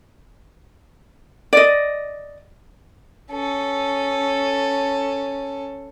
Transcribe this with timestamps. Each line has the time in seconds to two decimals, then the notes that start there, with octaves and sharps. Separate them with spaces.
1.53 D5 D#5
3.31 C#4 A4